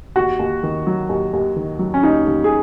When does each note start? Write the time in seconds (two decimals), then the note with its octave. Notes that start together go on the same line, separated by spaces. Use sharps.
0.16 D#2 F#4
0.39 D#2
0.63 D#3
0.87 F#3
1.09 D#2
1.33 D#2
1.56 D#3
1.79 F#3
1.94 C#4
2.03 D#2 D#4
2.26 D#2
2.44 G#4